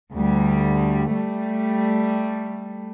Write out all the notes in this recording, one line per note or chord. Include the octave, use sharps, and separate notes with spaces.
D2 G3
G3 A3